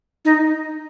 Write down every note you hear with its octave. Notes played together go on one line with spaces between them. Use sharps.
D#4